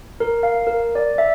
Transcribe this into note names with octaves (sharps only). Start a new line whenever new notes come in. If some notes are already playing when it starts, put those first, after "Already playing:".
A#4
F5
A#4
D5
E5